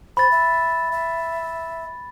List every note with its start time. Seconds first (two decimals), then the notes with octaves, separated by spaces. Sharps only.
0.17 C5 B5 A6
0.31 E5
0.92 E5